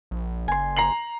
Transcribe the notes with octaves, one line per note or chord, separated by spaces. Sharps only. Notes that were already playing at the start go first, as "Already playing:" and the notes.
A#1
F#1 G#5 C6
A#5 C7 F#7